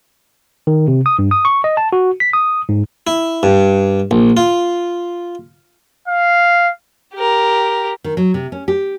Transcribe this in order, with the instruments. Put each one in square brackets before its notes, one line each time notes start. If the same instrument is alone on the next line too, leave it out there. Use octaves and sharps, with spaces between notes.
[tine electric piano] D#3
C3
D#6
G2
D#6
C#6
D#5
A5
F#4
B6
D#6
G#2
[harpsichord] E4
G2
A#1
F4
[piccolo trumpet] F5
[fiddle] G4 A#4
[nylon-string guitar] D#3
F#3
C3
C#4
G4